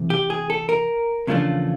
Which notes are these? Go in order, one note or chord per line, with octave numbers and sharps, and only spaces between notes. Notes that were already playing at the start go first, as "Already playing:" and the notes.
Already playing: C3 E3 A3 C4
G4
G#4
A4
A#4
E2 C#3 F3 A3 D4